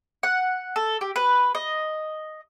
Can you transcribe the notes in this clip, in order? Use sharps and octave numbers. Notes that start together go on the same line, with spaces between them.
F#5
A4
G4
B4
D#5